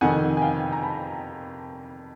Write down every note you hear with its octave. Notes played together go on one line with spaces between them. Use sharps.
F2 C3 D#3 F#5 G#5
G#5
F5 G5
A#5
A5 B5